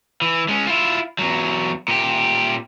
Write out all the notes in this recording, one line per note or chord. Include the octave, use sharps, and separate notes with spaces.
E3
G#3 C#4
E4 F4
E2 F#3
A#2 G4